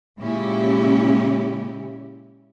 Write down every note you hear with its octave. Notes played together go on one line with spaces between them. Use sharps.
A#2 C#3 G#3 C#4 E4 G4